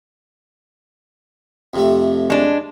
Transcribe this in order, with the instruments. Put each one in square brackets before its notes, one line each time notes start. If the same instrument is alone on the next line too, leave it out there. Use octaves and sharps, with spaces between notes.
[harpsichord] F2 C3 A3
[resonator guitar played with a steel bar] G#3 D4